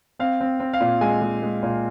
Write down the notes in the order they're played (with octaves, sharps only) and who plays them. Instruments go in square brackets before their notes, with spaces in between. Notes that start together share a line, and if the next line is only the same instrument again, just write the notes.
[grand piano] C4 F5
C4
C4
F5
A#2
G#3 G#5
G#3
G#3
A#2